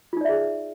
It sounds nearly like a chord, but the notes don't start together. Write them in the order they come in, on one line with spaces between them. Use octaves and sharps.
F4 D#4 D5 E5 G#4